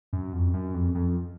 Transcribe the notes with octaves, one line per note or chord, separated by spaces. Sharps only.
F#2
F2
F#2
F2
F2